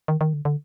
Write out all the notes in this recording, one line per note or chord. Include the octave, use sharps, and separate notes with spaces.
D#3
D#3
D3
D3